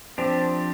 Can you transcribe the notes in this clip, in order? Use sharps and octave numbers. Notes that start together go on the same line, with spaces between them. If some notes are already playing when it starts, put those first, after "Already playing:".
F3 C4 D4 G4